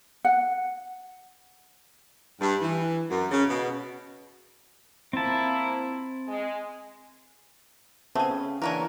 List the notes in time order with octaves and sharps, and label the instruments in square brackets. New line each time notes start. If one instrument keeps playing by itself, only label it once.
[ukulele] F#5
[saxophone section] G2
E3
F#2
C#3
B2
[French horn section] F3 A#3 E4 [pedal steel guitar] C4 A5
[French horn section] G#3
[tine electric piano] C#3 B3 C4 [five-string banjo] A3 G#5
[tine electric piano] C#3
[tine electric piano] E3 D4 C#5 [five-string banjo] A#3 B3 A#4